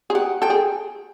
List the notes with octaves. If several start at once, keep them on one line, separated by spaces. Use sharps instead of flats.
G#4
G4 F#5
A4 G5
G#4